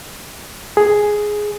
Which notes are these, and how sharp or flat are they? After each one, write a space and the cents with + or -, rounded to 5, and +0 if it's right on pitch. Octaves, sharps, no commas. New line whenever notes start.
G#4 +5